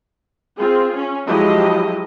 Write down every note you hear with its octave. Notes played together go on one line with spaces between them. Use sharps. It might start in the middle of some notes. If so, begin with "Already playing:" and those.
C4 F4 G#4
C#4
F3 F#3 G#3 E4 G4 D#5